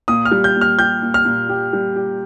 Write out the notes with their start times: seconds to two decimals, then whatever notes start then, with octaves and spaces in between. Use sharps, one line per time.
0.08 A#2 D#6
0.25 F6
0.31 G3
0.44 G6
0.56 A#2
0.61 F6
0.79 G4 G6
1.02 A#2
1.14 F6
1.25 A#2
1.49 G4
1.73 G3
1.96 G4